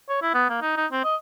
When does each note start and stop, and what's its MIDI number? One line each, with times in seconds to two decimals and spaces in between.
0.09 0.20 73
0.22 0.32 64
0.35 0.47 59
0.50 0.58 58
0.62 0.73 63
0.77 0.87 63
0.92 1.03 60
1.04 1.16 75